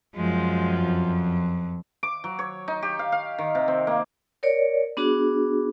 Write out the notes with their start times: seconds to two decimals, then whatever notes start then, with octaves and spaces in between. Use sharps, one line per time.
0.16 F#2 F3 G#3
0.82 F2
2.03 D6
2.24 F#3
2.39 C#5
2.68 D#4
2.83 G4
2.99 F5
3.12 F5
3.38 D#3
3.55 C3
3.68 C4
3.87 A#3
4.43 A#4 C#5 D5
4.97 B3 D4 F#4 G#4